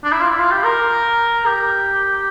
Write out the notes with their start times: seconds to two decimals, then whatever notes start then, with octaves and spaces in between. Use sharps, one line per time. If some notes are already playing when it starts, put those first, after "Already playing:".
0.04 D4
0.12 E4
0.21 F4
0.30 E4
0.39 F4
0.51 G4
0.64 A#4
1.46 G4